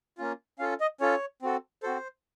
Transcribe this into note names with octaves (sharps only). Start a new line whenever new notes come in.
A#3 C#4 F4
C#4 F4 A4 F5
D#5
C#4 F4 A4 C#5
C4 F#4 A4
C4 F#4 A4 C5